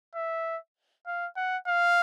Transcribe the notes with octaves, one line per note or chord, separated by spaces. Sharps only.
E5
F5
F#5
F5